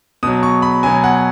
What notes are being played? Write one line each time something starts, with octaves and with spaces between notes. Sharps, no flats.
B2 F#3 D#6
C#6
B5
B2 F#3 G#5
F#5